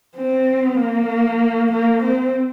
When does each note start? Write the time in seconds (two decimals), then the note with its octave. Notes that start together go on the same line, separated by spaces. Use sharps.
0.16 C4
0.78 A#3
1.72 A#3
2.03 C4